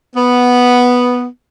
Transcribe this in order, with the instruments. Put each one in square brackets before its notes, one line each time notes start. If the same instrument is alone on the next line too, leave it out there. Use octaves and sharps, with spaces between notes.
[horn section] B3